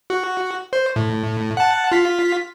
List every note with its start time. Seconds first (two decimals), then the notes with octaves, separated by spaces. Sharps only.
0.10 F#4
0.73 C5
0.96 A2
1.57 F#5 A5
1.92 F4 B6